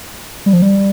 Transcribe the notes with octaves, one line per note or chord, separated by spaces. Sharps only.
G3
F3
G3